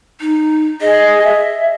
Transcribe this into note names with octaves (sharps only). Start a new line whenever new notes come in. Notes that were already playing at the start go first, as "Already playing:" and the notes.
D#4
G#4 D#5
E5